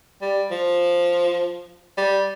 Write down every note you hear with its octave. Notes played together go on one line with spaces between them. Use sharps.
G3
F3
G3